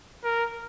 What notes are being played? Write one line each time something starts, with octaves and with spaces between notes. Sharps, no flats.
A#4